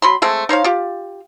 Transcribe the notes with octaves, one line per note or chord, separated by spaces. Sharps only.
F#3 B5 C6
G#3 A3 C4
D#4 C5 C#5 F5
F4 G4